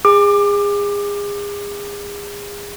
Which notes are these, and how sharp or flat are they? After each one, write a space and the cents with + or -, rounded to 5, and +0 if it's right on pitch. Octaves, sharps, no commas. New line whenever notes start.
G#4 -30 D6 +25